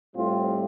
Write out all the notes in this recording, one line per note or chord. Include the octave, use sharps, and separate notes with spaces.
A2 G3 C4 F4